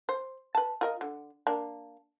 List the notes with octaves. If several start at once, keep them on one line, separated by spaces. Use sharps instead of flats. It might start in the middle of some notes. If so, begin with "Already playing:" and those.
C5
B4 A5
F4 A#4 D#5
D3
A#3 D4